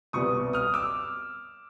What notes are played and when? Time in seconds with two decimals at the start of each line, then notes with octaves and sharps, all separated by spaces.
0.13 C2 B2 G3 B3 C#6 D#6
0.53 D#6 F6
0.74 D6 E6